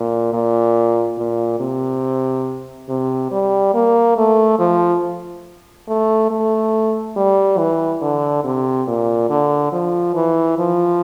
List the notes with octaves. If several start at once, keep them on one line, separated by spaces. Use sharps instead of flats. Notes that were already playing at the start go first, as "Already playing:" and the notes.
Already playing: A#2
A#2
A#2
C3
C3
G3
A#3
A3
F3
A3
A3
G3
E3
D3
C3
A#2
D3
F3
E3
F3